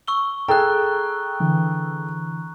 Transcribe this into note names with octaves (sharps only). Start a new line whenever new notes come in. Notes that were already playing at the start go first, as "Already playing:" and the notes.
C#6 E6 G7
G#4 A4 G5 A#5 F6 F#6
D3 E3